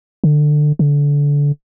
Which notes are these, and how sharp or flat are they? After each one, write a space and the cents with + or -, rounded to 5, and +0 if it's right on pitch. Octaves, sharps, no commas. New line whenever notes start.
D3 +20
D3 -25